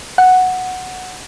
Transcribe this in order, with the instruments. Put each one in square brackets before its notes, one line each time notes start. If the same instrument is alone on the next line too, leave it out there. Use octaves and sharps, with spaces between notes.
[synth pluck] F#5